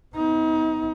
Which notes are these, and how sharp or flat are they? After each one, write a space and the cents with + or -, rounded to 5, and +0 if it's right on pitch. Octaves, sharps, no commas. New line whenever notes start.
B3 +30 D#4 +35